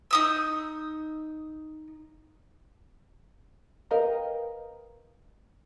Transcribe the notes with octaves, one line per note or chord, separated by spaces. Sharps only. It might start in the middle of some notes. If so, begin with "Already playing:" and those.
D#4 D#6 E6
A#4 B4 D#5 F5 G5 A#5